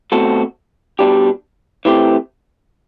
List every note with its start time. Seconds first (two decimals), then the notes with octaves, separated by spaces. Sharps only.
0.12 B2 A3 C4 F#4 A4
0.99 B2 G3 D4 G4
1.85 E3 A3 C4 G4